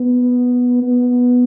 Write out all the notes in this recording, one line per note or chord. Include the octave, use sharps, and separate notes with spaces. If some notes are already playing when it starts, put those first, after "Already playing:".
Already playing: B3
B3